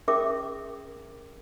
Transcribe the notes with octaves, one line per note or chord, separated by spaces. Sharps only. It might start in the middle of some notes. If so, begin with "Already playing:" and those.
C#4 G#4 A#4 E5 D6